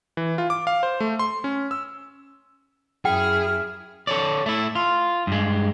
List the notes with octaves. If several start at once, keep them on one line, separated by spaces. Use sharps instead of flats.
E3
F4
D6
F5
C5
A3
C6
C#4
E6
F#2 E4 G#4 G5 F6
A4 C#5 D5
A3 E4
F4
G2 G#3